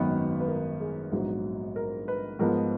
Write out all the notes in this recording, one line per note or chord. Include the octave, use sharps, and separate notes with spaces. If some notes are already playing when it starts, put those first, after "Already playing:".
Already playing: G#1 F#2 D#3 F#3 B3 B4
B4
A#4
G#4
A#1 G#2 F#3 B3 D#4 F#4
A#4
B4
G#2 F3 B3 A#4
D#5